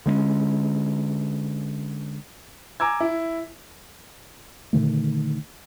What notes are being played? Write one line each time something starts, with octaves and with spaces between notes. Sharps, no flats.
D3 G#3 B3 C#4
G#5 A#5 D6 E6 G#6
E4
A#2 D3 D#3 A3